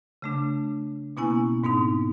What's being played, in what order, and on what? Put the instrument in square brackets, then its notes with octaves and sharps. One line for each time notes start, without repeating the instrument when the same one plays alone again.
[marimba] C#3 A3 D4
B2 A#3 B3 C#4 E4 G#5
G#2 B3 C4 D#4